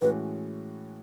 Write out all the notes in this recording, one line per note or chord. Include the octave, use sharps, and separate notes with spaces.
A2 E3 G#3 C#4 F#4 B4